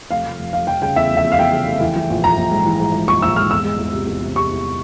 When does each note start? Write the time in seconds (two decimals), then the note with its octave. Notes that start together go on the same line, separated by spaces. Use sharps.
0.11 F1 F5
0.25 F1
0.39 F1
0.53 F1 F5
0.67 F1 G5
0.82 C#3 G5
0.96 E2 E5
1.10 F1
1.17 E5
1.24 E2
1.32 F5
1.39 E2 G5
1.53 C#3
1.67 F1
1.80 E3
1.96 E3
2.10 A#1
2.23 A#1 A#5
2.37 A#1
2.51 G#2
2.66 E3
2.80 G#2
2.94 G#2
3.08 A#1 C#6
3.22 A#1 E6
3.36 G#2 F6
3.50 E2 E6
3.64 G#3
3.79 E2
3.93 C3
4.07 E2
4.22 C3
4.36 C3 C#6
4.50 E2